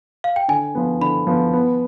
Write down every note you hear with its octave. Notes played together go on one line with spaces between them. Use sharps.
F5
G5
D3 G#5
F3 B3
D3 B5
F3 B3
B3